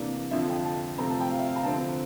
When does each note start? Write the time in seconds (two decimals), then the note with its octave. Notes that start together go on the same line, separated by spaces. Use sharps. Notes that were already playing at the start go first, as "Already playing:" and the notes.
Already playing: C3 E3 A#3 D4
0.31 F2 D3 F3 E5
0.49 G5
0.64 A5
0.97 C3 F3 A3 C4 A#5
1.09 A5
1.20 G5
1.31 F5
1.39 E5
1.47 F5
1.56 A#5
1.63 D3 F3 C4 A5